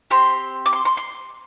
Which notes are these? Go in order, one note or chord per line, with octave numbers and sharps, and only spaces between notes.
C4 G4 C6
D6
C6
C6
C6